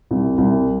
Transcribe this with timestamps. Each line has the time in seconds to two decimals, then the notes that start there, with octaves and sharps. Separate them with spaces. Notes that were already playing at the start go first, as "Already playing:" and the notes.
0.11 C2
0.38 C2